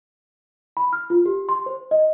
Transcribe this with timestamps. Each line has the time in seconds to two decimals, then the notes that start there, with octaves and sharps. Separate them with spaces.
0.77 B5
0.93 F6
1.10 F4
1.26 G4
1.49 C6
1.66 C5
1.91 D#5